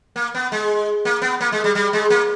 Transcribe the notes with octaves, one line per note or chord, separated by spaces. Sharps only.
A#3
B3
G#3
A#3
B3
A#3
G#3
G3
G3
G#3
A#3